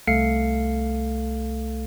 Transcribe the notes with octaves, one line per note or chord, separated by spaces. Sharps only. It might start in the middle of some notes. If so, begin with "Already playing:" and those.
C2 A3 A4 F5 C7 C#7